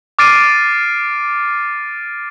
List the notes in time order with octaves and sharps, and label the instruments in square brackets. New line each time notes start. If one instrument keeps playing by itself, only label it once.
[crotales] D6 F6 A6 C7 D7 D#7